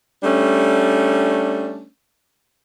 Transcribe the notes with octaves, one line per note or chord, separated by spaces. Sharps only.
G3 A3 C#4 D4